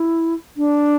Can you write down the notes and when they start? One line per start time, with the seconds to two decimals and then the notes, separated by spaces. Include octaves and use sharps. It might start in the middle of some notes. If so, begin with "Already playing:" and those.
Already playing: E4
0.57 D4